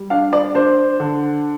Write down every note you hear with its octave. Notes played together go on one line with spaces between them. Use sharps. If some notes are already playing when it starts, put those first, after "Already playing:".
Already playing: G3
D4 F5
D5
D4 C5
D3